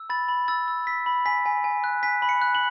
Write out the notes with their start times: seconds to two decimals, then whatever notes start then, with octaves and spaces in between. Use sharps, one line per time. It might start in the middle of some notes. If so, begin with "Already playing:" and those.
Already playing: E6
0.10 B5 A6
0.29 B5
0.48 E6 A6
0.68 E6
0.87 E6 B6
1.06 B5
1.26 G#5 B6
1.46 G#5
1.64 G#5
1.84 F#6
2.03 G#5 B6
2.22 B5
2.29 C#7
2.42 F#6
2.55 F#7